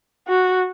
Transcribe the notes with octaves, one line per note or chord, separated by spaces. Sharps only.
F#4